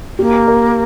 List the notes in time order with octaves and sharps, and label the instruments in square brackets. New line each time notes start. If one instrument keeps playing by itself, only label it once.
[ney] A#3 [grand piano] G4
[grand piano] A#4